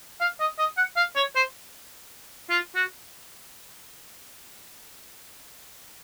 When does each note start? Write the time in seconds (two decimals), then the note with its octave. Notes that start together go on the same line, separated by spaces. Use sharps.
0.21 F5
0.40 D#5
0.59 D#5
0.77 F#5
0.97 F5
1.16 C#5
1.36 C5
2.50 F4
2.75 F#4